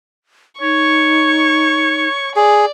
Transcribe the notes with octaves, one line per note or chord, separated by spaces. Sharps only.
D#4 C#5 C#6
G#4 D5